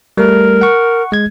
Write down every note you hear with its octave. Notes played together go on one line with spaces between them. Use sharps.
G3 A3 A#4
F#5 C#6
G#3 G#6